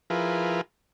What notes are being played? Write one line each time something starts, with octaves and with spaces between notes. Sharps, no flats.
F3 E4 F4 G#4 A#4 B4